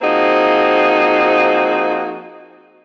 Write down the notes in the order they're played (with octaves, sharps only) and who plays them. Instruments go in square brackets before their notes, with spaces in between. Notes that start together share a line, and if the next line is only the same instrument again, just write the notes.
[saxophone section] F3 A#3 C4 D#4 F#4 G#4